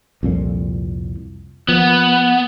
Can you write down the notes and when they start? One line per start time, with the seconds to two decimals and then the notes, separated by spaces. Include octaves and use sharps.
0.23 C2 F2 A#2
1.69 F3 A#3 B3